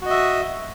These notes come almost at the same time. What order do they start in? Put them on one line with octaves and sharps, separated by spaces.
F#4 D#5 E5